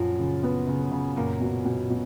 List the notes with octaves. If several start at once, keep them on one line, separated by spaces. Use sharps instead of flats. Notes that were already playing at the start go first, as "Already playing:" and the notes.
Already playing: F#2 A#2 F3 F4
C#3
B3
C#3
C#3
F#2 A#2 A#3
B2
B2
B2